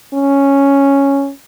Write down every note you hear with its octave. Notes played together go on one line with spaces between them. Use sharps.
C#4